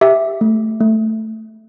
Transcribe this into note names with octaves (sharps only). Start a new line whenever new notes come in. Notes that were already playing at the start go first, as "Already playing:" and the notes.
G4 E5
A3
A3